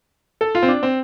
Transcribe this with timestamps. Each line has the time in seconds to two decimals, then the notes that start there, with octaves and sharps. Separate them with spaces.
0.41 A4
0.55 F4
0.63 C4
0.68 D4
0.83 C4